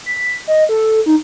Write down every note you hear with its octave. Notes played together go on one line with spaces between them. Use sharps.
B6
D#5
A4
D#4